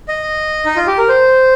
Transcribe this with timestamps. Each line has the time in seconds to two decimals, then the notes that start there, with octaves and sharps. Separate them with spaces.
0.08 D#5
0.66 D#4
0.76 F4
0.87 G4
0.98 A#4
1.09 C5